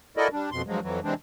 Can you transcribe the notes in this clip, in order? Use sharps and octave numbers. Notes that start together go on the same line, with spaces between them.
E4 F#4 A4 A#4 D5 D#5
G3 D4
F2 B2 C6
G2 F3 F#3 G#3
F2 E3 F#3
C3 E3 G#3 C4 D4